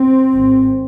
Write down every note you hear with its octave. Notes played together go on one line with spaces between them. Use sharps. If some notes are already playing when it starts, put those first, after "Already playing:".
Already playing: C4
G#1 G#2